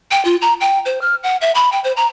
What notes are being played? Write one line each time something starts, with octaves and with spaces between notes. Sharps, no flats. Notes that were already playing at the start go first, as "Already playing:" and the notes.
G5
F4
A#5
G5
C5
F6
F#5
E5
B5
G5
C5
A#5